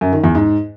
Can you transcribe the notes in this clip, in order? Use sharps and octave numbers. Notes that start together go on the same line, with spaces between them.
F#2
D#3
E2
G#2